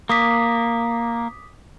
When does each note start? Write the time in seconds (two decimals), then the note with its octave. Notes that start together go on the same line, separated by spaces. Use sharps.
0.09 A#3 D6 D#6 B6